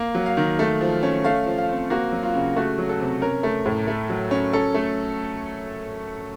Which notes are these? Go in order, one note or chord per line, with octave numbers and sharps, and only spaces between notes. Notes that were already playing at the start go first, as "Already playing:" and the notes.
Already playing: A#3
F#3
F5
D#3
A3
F3
C#4
A3 F5
F3
F5
C4
A#3 F#4
F#3
F4
C#3
A3 F#4
F#3
A4
C3
C#4 A#4
A3
A2
A3
F#3
C#4
C#4 A4
A3